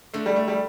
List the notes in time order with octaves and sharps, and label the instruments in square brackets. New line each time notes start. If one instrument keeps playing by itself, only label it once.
[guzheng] D3 [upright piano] A3
[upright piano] G3
A3
G3